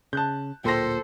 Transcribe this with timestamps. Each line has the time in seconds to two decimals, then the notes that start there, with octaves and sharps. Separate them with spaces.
0.13 C#3 A5 F#6 G6
0.64 D1 A#2 A4 C5 G5 C6 A#6